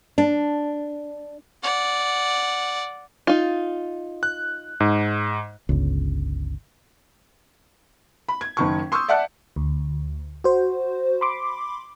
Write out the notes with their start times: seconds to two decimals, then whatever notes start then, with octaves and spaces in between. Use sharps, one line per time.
0.18 D4
1.63 D5 F#5
3.27 D#4 F4
4.23 F#6
4.80 G#2
5.69 G1 C#2
8.29 B5
8.41 G#6
8.57 F#1 D#3 C#6
8.92 C6 C#6 D#6 E6 G6
9.09 D5 E5 F#5 A5 F#6 C#7
9.56 D2
10.44 F#4 C5
11.21 B5 C6 D6